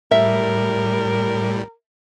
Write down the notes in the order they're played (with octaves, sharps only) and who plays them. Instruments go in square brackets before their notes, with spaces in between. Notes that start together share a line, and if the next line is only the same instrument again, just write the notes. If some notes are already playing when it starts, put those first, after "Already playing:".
[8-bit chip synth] A2 G3 [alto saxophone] A#4 [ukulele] E5